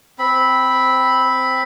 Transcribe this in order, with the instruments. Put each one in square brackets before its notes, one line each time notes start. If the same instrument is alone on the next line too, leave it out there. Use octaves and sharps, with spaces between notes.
[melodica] C4 B5